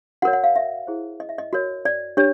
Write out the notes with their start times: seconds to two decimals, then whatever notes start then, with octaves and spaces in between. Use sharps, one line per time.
0.22 F#4 A#4 C#5 F#5
0.33 F#5
0.44 F5
0.56 E5
0.87 E4 G#4 C5
1.20 D#5
1.29 E5
1.38 D#5
1.53 F#4 A#4 C#5
1.85 D5
2.17 D4 G4 C#5